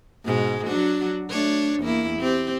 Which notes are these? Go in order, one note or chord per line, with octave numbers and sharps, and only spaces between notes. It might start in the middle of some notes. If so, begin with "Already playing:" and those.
G#2 B2 G#3
F#3 D4 F#4
A3 D4 C#5
E2 A#3 E4
C4 G4